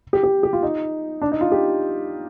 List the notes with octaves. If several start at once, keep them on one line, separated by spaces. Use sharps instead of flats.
G4
G4
G4
F4
D#4
D4
D#4
F4
G4